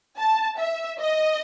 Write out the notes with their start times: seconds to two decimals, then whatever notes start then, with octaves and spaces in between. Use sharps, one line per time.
0.18 A5
0.58 E5
0.99 D#5